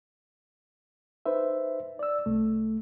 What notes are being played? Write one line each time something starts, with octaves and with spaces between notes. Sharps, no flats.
D#4 B4 C5 E5
D5 E6
C2 A3